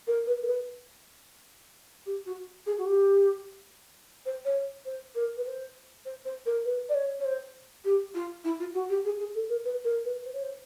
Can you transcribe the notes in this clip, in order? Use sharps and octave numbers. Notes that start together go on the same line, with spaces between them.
A#4
B4
A#4
B4
G4
F#4
G#4
F#4
G4
C5
C#5
C5
A#4
B4
C5
C5
C5
A#4
B4
D5
C#5
C#5
C5
G4
F4
E4
F4
F#4
G4
G#4
G#4
A4
A#4
B4
A#4
B4
C5
C#5
C5